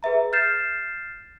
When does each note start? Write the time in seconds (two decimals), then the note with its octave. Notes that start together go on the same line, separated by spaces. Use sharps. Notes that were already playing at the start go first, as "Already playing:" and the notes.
0.03 G#4 B4 E5 A#5
0.33 F6 G6 A6 C7 E7